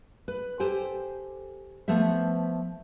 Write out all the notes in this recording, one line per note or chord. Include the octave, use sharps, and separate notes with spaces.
B4
G4 A4 C5 G5 G#5
F3 A3 B3 C5 E5